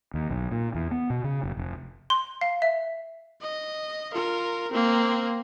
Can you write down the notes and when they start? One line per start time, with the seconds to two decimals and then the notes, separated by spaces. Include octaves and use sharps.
0.14 D#2
0.29 B1
0.51 A#2
0.74 E2
0.91 B3
1.10 B2
1.24 C#3
1.43 F#1
1.57 F1
2.10 C6
2.41 F5
2.62 E5
3.42 D#5
4.12 F4 A#4
4.72 A#3 C4